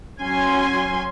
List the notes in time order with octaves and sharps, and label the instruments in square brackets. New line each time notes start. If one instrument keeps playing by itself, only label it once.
[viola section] F#3 C#4 G#5 C6